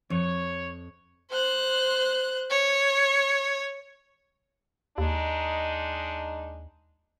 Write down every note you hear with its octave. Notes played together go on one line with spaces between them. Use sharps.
F2 C#5
C5 F#6
C#5
D#2 G#3 D4 D#4